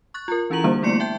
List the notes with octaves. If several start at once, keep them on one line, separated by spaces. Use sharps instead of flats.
C#6 F#6 A6
F4 A#4
E3 C#4 E4 G#4 A#5 F#7
D3 G3 A#3 D4 G#4 C5
A3 B3 E4 D5 C6 C#7
E5 G5 A5 G6